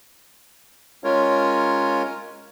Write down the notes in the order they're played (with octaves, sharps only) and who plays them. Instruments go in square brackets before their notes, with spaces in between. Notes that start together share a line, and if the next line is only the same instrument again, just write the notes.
[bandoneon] G#3 C#4 F4 A#4 C#5